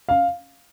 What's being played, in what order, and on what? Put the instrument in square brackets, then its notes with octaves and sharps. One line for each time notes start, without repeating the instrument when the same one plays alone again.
[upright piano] F5